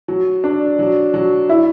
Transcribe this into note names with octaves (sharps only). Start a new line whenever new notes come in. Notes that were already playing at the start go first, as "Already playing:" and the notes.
F#3
D4
F#3
F#3
E4